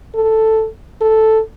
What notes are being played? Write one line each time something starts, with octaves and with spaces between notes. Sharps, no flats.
A4
A4